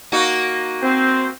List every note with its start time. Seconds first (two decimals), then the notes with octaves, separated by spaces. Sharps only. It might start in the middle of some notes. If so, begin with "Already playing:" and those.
0.12 A#3 D#4 F#4
0.82 C4 C5